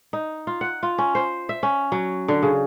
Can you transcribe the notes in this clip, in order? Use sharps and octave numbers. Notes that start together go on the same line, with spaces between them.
D#4
F4
F#5
F4
C#4
C5
E5
C#4
F#3
D3
C#3